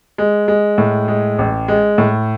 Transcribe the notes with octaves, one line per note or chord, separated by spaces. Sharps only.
G#3
G#3
A2
G#3
A1
G#3
A2